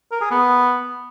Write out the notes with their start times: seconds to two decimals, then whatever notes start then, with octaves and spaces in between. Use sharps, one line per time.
0.12 A#4
0.21 G#4
0.31 B3